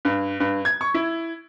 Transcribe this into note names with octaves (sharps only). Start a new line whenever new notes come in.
G2
G2
G#6
C#6
E4